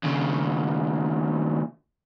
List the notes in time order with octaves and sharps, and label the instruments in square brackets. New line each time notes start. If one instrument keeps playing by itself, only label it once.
[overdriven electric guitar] D#2 C#3